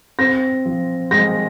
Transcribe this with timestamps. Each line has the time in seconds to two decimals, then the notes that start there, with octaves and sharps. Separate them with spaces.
0.19 C4 A#6
0.65 F3
1.11 G#3 A#6